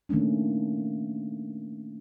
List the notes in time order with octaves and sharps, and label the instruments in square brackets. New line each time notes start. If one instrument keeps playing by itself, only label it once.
[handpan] D#3 A3 A#3 C#4 D4